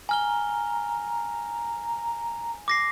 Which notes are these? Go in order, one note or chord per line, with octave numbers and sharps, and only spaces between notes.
G#5 A#5 F6 G7
D6 A#6 C7